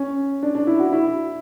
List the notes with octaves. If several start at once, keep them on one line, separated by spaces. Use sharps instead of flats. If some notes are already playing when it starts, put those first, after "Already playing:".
Already playing: C#4
D4
D4
E4
F#4
E4